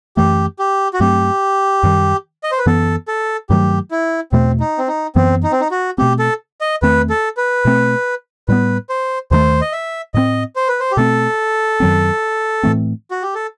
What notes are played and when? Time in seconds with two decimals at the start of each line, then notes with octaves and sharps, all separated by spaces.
0.17 F#2 E3 A3 G4
0.59 G4
0.93 F#4
1.00 G2 F#3 A3 C4 G4
1.83 F#2 D#3 G3
2.44 D#5
2.51 C5
2.58 B4
2.66 F#2 E3 B3 A4
3.08 A4
3.50 G2 D#3 F#3 A3 G4
3.91 E4
4.32 E2 B2 A3 C4
4.60 D#4
4.78 C4
4.88 D#4
5.16 F#2 E3 B3 C4
5.43 D#4
5.52 C4
5.61 D#4
5.71 F#4
5.98 B2 A3 C4 G4
6.19 A4
6.61 D#5
6.82 E2 D#3 A3 C4 B4
7.10 A4
7.37 B4
7.65 B2 A3 C4
8.48 A2 G3 B3 B4
8.89 C5
9.31 D#2 D#3 F#3 A3 C5
9.61 D#5
9.72 E5
10.14 A2 G3 C4 D#5
10.56 C5
10.68 B4
10.80 C5
10.92 G4
10.97 B2 A3 C4 A4
11.80 F#2 D#3 F#3 C4
12.63 A2 E3 A3 C4
13.11 F#4
13.22 G4
13.35 A4